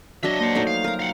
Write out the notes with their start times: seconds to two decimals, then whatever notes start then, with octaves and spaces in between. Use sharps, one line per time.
0.23 F#3 D4 C#5 D#5 E5
0.39 A#3 C5 D#5 F#5
0.55 F2 F#3 A3 D#4 G6
0.67 F5
0.84 A#4 A#5
0.99 F5 F#5